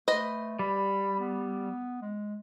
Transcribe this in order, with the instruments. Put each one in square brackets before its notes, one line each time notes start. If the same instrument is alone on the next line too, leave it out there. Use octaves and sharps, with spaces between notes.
[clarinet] A3 [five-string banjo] B4 C5 D#5
[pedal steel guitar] G3 [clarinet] B5
[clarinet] B3
G#3